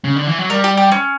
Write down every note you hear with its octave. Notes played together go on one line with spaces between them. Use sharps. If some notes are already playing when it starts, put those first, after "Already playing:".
C#3
D3
E3
F#3
G3 A#4
G4
G4
C#4